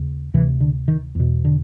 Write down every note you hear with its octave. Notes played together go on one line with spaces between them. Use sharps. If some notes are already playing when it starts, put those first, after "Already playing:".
Already playing: D#2 C#3
D2 C3 E3
D3
D#3
E2 B2
D3